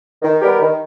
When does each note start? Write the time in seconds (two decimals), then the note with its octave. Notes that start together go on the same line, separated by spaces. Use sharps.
0.23 D#3
0.42 G3 B3 G4 A#4
0.59 D#3